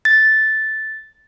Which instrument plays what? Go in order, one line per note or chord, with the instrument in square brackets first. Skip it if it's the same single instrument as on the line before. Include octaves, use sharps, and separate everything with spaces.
[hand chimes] A6